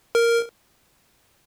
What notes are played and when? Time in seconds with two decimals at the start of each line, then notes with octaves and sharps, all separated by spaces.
0.15 A#4